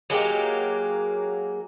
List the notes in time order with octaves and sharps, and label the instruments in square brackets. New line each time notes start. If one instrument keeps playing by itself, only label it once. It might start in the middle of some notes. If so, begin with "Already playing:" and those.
[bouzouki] F#3 G#3 A#3 G4